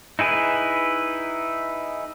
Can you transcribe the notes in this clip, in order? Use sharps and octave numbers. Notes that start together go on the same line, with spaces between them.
D#4 E4 G#4 B4